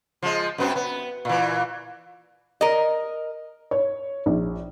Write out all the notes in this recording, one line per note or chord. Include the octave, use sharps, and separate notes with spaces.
F3 G#3
F#2 B3 C4
B3
A#2 E3
A#4 D#5
C#5
A#1